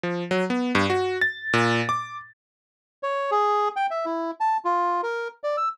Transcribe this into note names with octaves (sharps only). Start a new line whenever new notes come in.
F3
F#3
B3
G2
F#4
A6
A#2
D6
C#5
G#4
G5
E5
E4
A5
F4
A#4
D5
E6